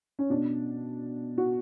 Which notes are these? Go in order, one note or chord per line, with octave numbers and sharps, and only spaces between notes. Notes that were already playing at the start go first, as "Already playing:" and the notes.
C#4
B2 D4
F#4